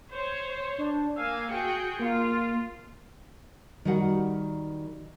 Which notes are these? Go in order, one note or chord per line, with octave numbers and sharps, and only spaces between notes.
C5 C#5
D4
A#3 F5 G#5 E6
F#4 G#4 G5 C#7
A#3 F4
D#3 G3 F#4 A#4 F#5